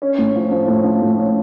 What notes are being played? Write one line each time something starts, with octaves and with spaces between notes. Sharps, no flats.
C#4
A2
F3
F3
A2
F3
A2
C#4